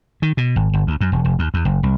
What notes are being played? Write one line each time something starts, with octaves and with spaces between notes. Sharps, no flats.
D#3
B2
G#1
G1
D2
F#2
E1
F1
D#2
E2
F#1
C2